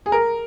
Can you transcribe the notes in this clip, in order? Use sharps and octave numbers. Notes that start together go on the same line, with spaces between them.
G#4
A#4